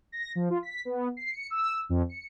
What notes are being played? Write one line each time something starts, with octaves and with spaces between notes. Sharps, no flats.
A#6
F3
F4
B6
B3
C7
C#7
E6
F2
C#7